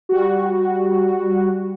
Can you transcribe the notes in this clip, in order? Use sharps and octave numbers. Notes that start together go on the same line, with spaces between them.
G3 F#4